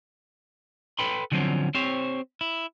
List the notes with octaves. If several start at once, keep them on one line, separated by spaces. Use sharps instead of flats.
A4 B4 G5 B5 C6
D3 F3 F#3 A#3 C4 C#4
C4 G4 C5 C#5
E4